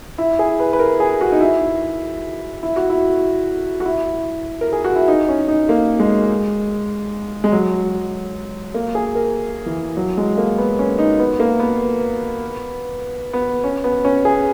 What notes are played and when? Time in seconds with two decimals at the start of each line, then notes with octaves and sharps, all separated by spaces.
0.18 E4
0.39 G#4
0.60 B4
0.73 B4
0.79 A#4
1.00 G#4
1.21 F#4
1.32 D#4
1.41 E4
2.63 E4
2.76 F#4
2.90 E4
3.80 F#4
3.85 E4
4.61 A#4
4.73 G#4
4.84 F#4
4.96 E4
5.08 D#4
5.29 C#4
5.48 D#4
5.69 A#3
5.99 G#3
7.44 G#3
7.52 F#3
8.75 A#3
8.95 G#4
9.15 A#4
9.66 E3
9.97 F#3
10.17 G#3
10.38 A#3
10.58 B3
10.79 C#4
10.98 D#4
11.20 B3
11.40 A#3
11.60 B3
13.33 B3
13.64 C#4
13.84 B3
14.05 C#4
14.25 G#4